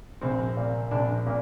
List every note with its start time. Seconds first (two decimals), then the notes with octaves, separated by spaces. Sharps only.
0.21 A#1 C4
0.57 A#2
0.91 A#1 D4
1.26 A#2